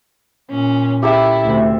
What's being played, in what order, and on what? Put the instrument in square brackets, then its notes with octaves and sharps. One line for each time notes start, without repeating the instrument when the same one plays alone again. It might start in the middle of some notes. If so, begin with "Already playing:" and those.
[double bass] A#2 [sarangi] C#4
[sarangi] E4 [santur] G4 A4 E5
[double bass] D2 C3